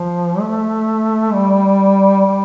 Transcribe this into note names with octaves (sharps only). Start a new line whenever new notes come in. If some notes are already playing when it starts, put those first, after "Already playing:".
Already playing: F3
A3
G3
G3